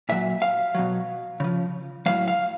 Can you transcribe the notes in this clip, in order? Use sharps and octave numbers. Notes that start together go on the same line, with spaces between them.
A#2 F#3 E5
F5
B2 F#3
C#3 F3
A2 F#3 F5
F5